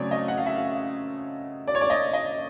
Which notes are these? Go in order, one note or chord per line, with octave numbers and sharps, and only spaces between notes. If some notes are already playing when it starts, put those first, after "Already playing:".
Already playing: C#3 F#3 A3 C4 C#5 D5
D#5
F#5
F5
E5
F5
D5
C#5
D5
D#5
D#5